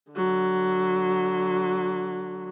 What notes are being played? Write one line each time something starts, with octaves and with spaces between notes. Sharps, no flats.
D3 F#3